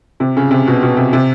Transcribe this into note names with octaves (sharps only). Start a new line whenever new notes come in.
C3
C#3
C3
B2
B2
C3
C3